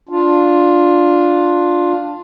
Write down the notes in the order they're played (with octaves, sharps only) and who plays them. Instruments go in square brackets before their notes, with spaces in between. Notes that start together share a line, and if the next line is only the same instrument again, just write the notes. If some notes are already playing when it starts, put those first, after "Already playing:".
[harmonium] D4 F4